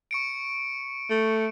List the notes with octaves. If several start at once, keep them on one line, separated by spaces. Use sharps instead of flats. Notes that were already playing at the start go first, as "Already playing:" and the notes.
C#6 C#7 D7
A3